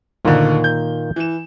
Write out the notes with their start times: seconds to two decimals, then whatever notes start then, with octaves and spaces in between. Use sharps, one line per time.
0.25 D2 A#2 D3 D#3 A#3
0.64 G6
1.16 E3 E7